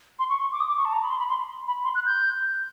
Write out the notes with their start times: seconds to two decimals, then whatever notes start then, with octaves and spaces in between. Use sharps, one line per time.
0.19 C6
0.30 C#6
0.41 C#6
0.52 D6
0.60 D#6
0.69 D6
0.77 C#6
0.85 A5
0.93 A#5
1.02 B5
1.10 C6
1.19 B5
1.29 C6
1.67 B5
1.84 C6
1.95 F#6
2.06 G6